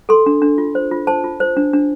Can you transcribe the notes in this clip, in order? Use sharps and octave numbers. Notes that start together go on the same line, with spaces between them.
A4 C6
D4
D4
F4
C5
F4
C5 A5
F4
C5
D4
D4